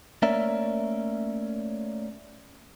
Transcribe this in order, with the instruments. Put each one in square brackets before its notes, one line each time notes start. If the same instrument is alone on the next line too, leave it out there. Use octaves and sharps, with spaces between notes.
[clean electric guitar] A3 A#3 C#4 A#4 D5 E5